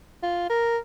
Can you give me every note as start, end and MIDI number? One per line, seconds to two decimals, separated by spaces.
0.23 0.46 65
0.50 0.77 70